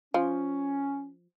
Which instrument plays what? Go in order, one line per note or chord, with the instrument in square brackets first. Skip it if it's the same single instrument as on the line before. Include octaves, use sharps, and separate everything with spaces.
[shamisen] F3 [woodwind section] C#4